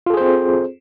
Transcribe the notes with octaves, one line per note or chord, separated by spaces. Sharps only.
C4 F4 G#4 A4 C5